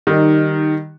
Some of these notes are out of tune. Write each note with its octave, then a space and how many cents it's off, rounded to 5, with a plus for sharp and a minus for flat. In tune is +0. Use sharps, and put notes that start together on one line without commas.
D#3 -15 G3 -10 D#4 +0